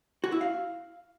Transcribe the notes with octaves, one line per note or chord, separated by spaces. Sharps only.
F#4
E4
F5